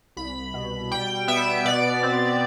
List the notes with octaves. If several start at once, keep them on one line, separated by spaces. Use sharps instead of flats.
C2 B5
B2
G3 G5
B3 E5
B2 D5
C4